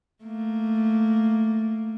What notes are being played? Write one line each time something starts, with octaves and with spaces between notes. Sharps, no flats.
A3 A#3